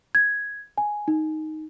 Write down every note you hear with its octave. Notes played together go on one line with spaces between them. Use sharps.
G#6
G#5
D#4